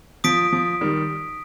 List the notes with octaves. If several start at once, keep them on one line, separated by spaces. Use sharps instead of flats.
F3 D#6 B6 D7
F3
D#3 G3